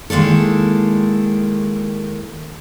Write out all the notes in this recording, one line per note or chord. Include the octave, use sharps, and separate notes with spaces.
D#3 G#3 A#3 E4 A4